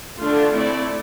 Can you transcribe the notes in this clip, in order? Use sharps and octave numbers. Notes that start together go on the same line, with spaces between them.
D3 A3 D4 F4
A3 C4 E4 A4 D5